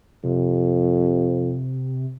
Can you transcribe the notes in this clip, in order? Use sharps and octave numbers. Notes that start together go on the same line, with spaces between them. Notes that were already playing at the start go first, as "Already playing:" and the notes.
F2 C3